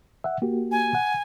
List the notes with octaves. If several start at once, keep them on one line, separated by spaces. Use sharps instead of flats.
E5 F#5
A#3 F#4 G4
G#5
F#5